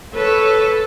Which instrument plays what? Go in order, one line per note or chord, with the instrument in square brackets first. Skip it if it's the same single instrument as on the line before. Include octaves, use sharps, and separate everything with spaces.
[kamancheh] A4 [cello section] B4 C#5